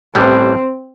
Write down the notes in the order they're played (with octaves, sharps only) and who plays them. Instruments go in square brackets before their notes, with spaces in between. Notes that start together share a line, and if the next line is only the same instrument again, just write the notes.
[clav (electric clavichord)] A1 A2 E3 G3 B3 [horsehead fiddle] C4